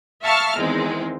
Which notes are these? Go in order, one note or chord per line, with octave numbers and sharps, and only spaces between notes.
E5 F5 A5 C#6 F6
E2 D#3 G#3 C4